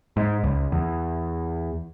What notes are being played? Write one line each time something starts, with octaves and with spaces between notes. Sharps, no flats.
G#2
C#2
E2